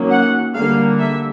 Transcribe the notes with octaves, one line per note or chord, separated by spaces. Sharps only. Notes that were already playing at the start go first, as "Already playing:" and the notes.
Already playing: D#3 F#3 A#3 C#4
F#5
D3 G3 A#3 F5
E5